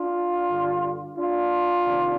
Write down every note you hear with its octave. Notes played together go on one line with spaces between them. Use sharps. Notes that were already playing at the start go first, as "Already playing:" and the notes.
Already playing: D4 F4
G2 D3 G3
D4 F4
C3 D#3